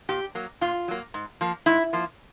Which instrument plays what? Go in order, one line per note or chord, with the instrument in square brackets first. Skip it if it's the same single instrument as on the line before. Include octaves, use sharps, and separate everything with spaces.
[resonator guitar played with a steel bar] A#2 G4
F#3 A#3
A#2 F4
F#3 A#3
G#2
F3 A#3
G#2 E4
F3 A#3